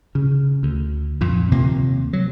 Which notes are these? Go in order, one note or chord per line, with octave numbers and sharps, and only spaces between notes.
C#3
D2
F2 A#2
D#2 C3 A#3
F#3